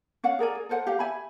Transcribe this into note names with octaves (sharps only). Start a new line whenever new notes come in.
C#4 F5 F#5
G#4 A#4 D5 G#5
G#4
A4 A#4 C5 F#5
G4 F5
E5 G#5 B5